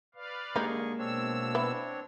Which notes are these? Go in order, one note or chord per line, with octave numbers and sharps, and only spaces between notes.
B4 D5 F5
D3 G3 G#3 A#3 D#4 G#4 C#6
B2 C4 D4 C#5 E6
B3 E4